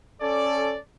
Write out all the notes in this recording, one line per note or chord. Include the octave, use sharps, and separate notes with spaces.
C#4 A4 D5